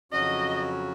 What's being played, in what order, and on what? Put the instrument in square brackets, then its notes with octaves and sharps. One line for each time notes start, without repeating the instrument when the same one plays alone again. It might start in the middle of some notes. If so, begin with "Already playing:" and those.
[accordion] F2 C#3 F#3 C#4 F#4 [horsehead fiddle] D#5